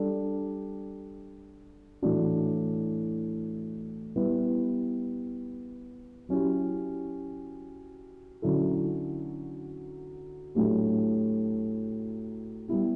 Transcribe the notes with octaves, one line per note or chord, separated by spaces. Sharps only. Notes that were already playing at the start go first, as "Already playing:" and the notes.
Already playing: G3 D4 A4
A2 E3 A3 D4 F#4
G3 B3 E4 B4
F#3 C#4 E4 G4
D3 F#3 C#4 E4 A4
A2 F#3 A3 D4 G4
G3 B3 E4 G4